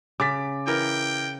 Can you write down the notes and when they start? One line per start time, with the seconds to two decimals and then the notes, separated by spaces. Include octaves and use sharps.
0.20 C#3 D6 A6 B6
0.67 E3 A#4 G5